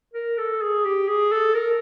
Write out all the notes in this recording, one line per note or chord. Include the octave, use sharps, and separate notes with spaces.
A#4
A4
G#4
G4
G#4
A4
A#4